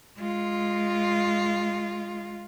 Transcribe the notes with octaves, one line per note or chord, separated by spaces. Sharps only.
G#3 F4